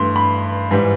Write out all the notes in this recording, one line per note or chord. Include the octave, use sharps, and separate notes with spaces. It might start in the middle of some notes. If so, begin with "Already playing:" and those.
Already playing: G2 E3 A3 C6
B5
G#2 E3 G3